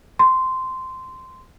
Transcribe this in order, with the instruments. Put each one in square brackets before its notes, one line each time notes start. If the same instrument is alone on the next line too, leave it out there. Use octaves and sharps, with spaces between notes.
[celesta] C6